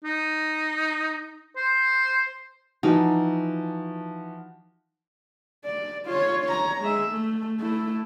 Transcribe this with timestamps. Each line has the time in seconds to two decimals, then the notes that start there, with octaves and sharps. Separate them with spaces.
0.04 D#4
1.56 C5
2.83 E3 F3 D#4 F#4
5.65 D5
6.05 F4 C#5
6.45 C#5 A#5
6.81 G#3 E5
7.10 A3
7.60 A3 E4